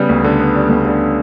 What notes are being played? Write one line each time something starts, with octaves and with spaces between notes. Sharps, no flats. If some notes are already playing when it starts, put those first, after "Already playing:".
Already playing: C#3 G3 B3
D2
D3
B3
G3
D2
D3